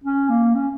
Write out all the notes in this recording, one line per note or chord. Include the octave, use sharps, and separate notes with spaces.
C#4
A#3
C#4